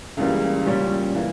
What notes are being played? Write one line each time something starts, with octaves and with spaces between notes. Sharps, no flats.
C#2 C#3 E3 G3 A#3
A#2 G3 C#4 G4
E3 A#3